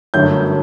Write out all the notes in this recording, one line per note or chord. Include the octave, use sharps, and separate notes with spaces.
G1 F#2 D3 F#3 A3 G6